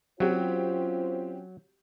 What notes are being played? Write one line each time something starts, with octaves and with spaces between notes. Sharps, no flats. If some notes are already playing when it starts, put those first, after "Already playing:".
F#3 C4 C#4 F4 G4 C5